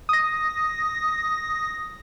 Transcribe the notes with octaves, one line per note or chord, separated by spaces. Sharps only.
D#6 A#6